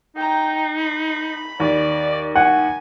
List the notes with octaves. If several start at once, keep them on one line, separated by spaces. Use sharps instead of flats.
D#4 G5 A#5
B5
D#2 D5
F#5 G#5